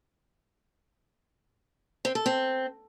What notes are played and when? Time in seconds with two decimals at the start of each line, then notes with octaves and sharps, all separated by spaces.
2.05 C4
2.15 A4
2.26 C4